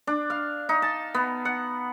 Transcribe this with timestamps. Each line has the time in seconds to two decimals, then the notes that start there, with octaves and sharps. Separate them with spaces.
0.07 D4
0.30 F5
0.69 D#4
0.82 A5
1.15 B3
1.45 F#5